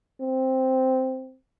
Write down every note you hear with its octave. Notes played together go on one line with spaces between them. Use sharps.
C4